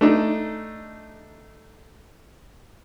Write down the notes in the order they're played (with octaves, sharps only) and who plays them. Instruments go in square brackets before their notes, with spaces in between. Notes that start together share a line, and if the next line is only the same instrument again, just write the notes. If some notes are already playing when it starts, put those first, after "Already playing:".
[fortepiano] A3 D4 D#4